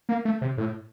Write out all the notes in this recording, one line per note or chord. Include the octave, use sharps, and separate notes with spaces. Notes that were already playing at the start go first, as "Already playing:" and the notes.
A#3
A3
C3
A2